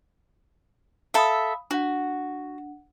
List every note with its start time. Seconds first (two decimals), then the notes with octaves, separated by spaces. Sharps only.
1.14 A4 E5 F5 B5 D#6
1.71 D4 F#4 F#5